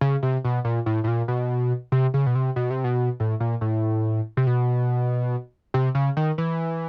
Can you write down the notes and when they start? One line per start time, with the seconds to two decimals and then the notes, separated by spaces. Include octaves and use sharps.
0.01 C#3
0.23 C3
0.44 B2
0.65 A#2
0.86 A2
1.04 A2
1.08 A#2
1.28 B2
1.92 C3
2.14 C#3
2.26 B2
2.35 C3
2.56 B2
2.70 C3
2.84 B2
3.20 A2
3.40 A#2
3.61 A2
4.37 C3
4.47 B2
5.74 C3
5.95 C#3
6.17 D#3
6.38 E3